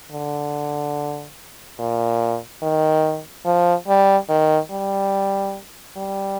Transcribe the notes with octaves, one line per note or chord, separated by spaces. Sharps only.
D3
A#2
D#3
F3
G3
D#3
G3
G3